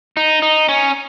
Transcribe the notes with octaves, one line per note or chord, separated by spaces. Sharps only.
D#4
D#4
C#4